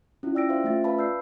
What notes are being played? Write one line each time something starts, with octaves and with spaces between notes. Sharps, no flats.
C#4 E4 F4
D5 G5 E6 A#6 D7
C5 E5 F5
A3 C#4 F4 E5 A6
B4 F5 A5 B5
D5 E6 G6 C7